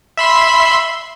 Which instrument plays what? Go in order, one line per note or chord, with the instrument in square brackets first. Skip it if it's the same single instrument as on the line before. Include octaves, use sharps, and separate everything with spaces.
[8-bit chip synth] E5 B5 C6